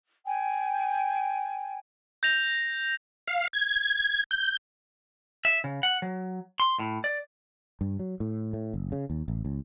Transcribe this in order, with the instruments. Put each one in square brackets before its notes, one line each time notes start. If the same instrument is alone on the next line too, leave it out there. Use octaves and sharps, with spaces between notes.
[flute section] G5 G#5
[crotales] G6 A#6 F7
[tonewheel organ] F5
G#6
G6
[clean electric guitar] E5
C#3
F#5
F#3
C6
A2
D5
[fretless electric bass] G2
F#3
A2
A2
F#1
C#3
D#2
A1
C#2